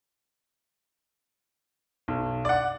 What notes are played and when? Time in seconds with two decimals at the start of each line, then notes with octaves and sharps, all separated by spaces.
2.08 B1
2.45 D5 F#5